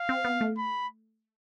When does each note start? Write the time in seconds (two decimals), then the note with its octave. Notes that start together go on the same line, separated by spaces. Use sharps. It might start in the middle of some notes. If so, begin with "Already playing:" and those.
Already playing: F5
0.09 C4
0.25 B3
0.41 A3
0.58 B5